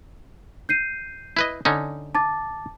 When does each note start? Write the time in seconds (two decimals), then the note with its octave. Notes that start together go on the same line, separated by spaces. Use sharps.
0.69 G6 C7 D#7
1.37 E4 B4 D#5
1.65 D3 C#4 D#4
2.15 A5 D6 A6